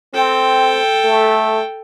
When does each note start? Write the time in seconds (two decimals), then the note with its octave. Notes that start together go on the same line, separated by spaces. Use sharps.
0.14 C4 A4 G5
1.05 A3